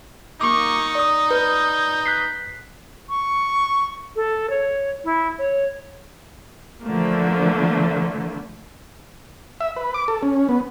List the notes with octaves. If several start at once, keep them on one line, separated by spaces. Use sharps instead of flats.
A#3 D#4 C#6 D6
D5 D#6
B4 G6
F#6 B6 C7
C#6
A4
C#5
E4
C#5
D3 E3 F3 A3 A#3
E5
B4
D6
A4
C#4
B3